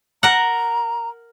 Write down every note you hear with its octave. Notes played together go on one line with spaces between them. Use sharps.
A#4 F#5 A#5